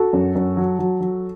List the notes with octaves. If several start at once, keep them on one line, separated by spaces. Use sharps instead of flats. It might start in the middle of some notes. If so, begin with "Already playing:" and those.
Already playing: F#4 A4
F#2
F#2
F#3
F#3
F#3